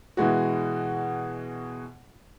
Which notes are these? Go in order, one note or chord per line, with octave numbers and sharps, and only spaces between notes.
B2 E3 G#3 F#4